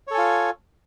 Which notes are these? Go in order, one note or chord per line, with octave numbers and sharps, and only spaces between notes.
F4 A4 C#5 G#5